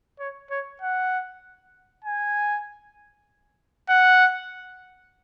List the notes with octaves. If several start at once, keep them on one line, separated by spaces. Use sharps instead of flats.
C#5
C#5
F#5
G#5
F#5